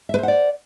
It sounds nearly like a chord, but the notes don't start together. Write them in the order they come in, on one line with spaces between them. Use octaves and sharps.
E5 B4 C5 F#5 D5